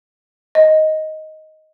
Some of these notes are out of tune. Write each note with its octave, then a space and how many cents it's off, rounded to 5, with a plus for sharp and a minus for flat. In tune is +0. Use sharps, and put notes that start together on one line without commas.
D#5 +10